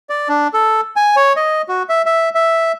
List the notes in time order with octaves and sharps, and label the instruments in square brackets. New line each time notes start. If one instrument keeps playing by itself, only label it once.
[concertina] D5
D4
A4
G#5
C#5
D#5
F#4
E5
E5
E5